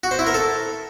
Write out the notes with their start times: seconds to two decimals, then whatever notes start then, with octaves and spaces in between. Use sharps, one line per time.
0.04 F#4
0.11 C5
0.19 E4
0.27 A#4
0.34 A4